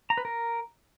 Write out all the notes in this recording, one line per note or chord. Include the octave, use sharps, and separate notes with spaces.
A#5
B4
A#4